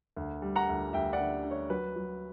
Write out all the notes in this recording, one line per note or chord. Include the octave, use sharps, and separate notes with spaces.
D2
G3
F#5 A#5
D2
D2 E5 G5
D5 F#5
D3
D3
C#5
F#3 B4
F#3